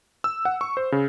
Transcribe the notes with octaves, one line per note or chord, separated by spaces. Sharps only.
E6
F#5
C#6
C5
C#3